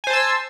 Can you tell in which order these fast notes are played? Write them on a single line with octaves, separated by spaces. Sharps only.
G#5 C5 A5 E6